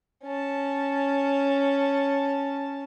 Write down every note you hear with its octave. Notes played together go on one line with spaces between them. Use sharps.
C#4 A5